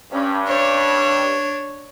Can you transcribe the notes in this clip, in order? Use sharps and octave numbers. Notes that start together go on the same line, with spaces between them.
G2 C#4
D4 C#5